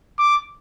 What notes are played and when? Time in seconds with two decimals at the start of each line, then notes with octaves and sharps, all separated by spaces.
0.19 D6